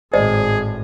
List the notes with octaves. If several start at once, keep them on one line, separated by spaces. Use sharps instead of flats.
G#1 A2 G#4 C5 D5 D#5